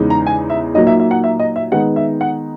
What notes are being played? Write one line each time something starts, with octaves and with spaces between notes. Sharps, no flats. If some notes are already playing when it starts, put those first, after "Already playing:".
Already playing: E2 C#3 G#3 D#4
A#5
G#5
E5
A#2 F#3 A#3 D#4 D#5
E5
E5
F#5
E5
D#5
E5
D#3 G#3 B3 D#4 F#5
E5
F#5